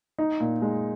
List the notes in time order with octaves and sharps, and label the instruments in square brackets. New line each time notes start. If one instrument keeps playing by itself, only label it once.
[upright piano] D#4
A#2
G#3